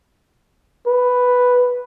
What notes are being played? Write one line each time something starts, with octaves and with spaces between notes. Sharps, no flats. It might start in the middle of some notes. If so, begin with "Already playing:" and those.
B4